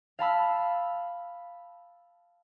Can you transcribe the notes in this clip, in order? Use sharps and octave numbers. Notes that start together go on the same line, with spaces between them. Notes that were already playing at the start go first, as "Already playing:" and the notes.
F5 A5 B5 E6